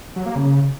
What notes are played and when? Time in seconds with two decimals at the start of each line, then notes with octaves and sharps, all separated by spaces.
0.16 F#3
0.26 A#3
0.36 C#3